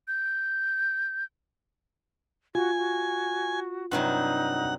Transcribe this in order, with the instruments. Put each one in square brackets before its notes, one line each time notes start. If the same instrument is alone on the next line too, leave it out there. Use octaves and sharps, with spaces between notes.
[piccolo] G6
[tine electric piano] F4 [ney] F#4 [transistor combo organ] G#5
[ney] F#4
[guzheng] G2 C3 F#3 [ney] D#4 [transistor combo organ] F#5